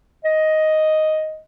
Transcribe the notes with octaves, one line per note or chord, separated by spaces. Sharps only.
D#5